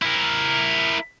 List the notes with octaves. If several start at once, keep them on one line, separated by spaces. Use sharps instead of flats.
E4 A#4